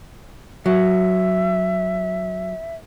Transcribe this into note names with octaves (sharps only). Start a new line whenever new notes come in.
F#3 E5